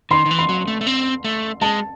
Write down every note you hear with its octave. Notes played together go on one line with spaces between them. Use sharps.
D#3 C6
D#3
E3
C6
F#3
A3
A3
C4
A3
G#3 A5